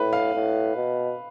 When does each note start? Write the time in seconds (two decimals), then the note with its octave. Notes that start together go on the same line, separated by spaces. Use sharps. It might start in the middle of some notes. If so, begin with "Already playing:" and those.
Already playing: A2 B4
0.13 F5
0.34 A2
0.76 B2